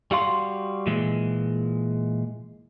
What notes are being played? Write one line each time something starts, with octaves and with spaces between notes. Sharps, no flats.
G3 F#4 F5 C6
A#2 E3 G#3